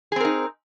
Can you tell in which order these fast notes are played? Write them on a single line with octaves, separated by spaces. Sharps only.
G#4 C4 A#4 D#4